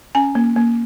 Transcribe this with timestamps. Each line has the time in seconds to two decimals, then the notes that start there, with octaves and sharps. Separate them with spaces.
0.15 C#4 G#5
0.35 A#3
0.56 A#3